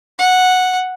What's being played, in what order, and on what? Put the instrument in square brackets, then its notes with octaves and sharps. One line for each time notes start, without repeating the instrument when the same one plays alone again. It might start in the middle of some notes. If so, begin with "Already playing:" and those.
[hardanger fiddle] F#5